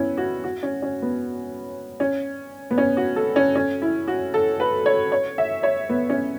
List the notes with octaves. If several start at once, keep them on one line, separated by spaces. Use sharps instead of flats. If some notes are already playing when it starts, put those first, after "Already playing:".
Already playing: B3 C#4 E4
F#4
F#4
C#4
C#4
B3
C#4
B3
C#4
F#4
A4
C#4
C#4
E4
F#4
A4
B4
C#5
C#5
E5
C#5
B3
C#4